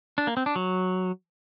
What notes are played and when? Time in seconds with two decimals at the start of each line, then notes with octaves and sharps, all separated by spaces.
0.18 D4
0.27 A#3
0.37 C4
0.46 D4
0.56 F#3